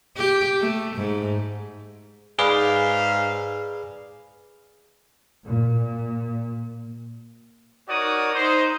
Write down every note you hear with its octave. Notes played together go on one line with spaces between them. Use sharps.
G4
A3
G#2
G#2 G#4 B4 D5 F5
A#2
D#4 F#4 A#4 C#5 D5 D#6
D#4 C5